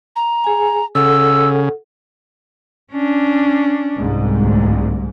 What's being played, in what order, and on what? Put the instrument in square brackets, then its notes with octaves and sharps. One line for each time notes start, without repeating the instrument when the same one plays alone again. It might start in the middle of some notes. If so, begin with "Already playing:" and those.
[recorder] A#5
[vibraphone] G#4 G#5
[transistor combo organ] C#3 [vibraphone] A4 F#5 [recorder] E6
[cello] C#4 D4
[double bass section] C2 G#2
[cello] D2